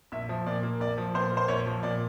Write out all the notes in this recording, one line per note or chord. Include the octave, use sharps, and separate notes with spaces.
A#1 E5
F3
A#2 D5
A#3
A#1 D5
F3
A#2 C5
A#3
C5
A#1 C#5
F3
A#2 D5